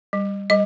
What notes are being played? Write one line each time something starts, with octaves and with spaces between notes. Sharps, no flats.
G3
G3 D#5